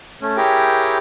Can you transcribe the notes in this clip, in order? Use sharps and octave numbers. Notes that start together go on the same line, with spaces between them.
A3 C#4
E4 G4 G#4 A#4 C#5 G5